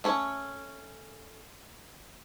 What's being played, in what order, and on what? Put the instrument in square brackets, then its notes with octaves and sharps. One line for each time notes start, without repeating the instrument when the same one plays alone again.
[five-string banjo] A3 C#4 C#5